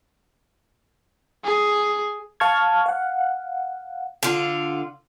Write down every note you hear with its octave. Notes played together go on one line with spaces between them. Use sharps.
G#4
F5 A5 C#6 F6 G#6
F5 F#5
D3 F4